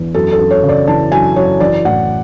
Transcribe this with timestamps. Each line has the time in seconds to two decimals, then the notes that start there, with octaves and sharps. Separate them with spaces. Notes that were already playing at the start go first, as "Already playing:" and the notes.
Already playing: E2
0.14 F#2 A4
0.32 A4
0.39 F#2
0.51 C#5
0.64 C#3
0.69 D5
0.88 E3 A5
1.12 F#2 G#5
1.36 F#2 C#5
1.60 E3 D5
1.85 A2 F#5